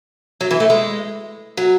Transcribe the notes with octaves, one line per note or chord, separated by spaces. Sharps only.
F#3
E3
A3
G#3
F#3